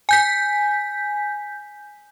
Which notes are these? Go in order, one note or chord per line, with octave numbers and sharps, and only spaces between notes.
G#5 G6 B6